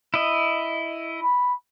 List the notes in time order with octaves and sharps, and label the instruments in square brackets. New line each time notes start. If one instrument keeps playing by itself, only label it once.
[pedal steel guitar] E4 D#5
[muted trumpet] B5